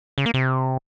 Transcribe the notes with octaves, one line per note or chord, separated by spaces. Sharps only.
C#3
A#3
C3